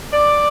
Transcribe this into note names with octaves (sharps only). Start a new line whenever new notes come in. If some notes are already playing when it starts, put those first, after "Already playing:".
D5